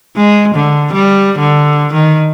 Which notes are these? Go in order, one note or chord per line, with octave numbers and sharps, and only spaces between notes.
G#3
D3
G3
D3
D#3